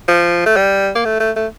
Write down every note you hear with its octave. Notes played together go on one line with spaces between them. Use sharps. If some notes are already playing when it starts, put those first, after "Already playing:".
F3
A3
G3
A#3
A3
A3
A3